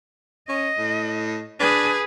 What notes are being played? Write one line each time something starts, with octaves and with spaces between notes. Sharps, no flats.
C#4 D#5
A2
D4 G#4 B4